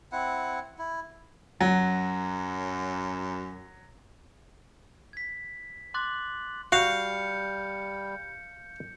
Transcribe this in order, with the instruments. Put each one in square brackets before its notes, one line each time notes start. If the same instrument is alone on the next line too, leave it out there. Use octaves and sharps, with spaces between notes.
[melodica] C4 E4 F#5
E4
[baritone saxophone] F#2 [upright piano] F#3
[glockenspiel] G#6 B6
C6 D6 F#6 A6 F#7
[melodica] G3 [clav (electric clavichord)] F#4 [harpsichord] F5 [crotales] G6 C#7